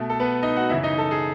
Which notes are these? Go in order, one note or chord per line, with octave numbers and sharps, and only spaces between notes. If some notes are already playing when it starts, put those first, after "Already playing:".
Already playing: B2 A3
A4
B3 B4
D#4 D#5
F#4 F#5
F#2 C#3 E3 E4 E5
D#4 D#5
A4
G#4